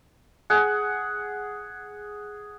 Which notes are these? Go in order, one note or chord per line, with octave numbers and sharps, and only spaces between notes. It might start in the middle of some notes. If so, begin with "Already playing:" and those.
G#4 F#5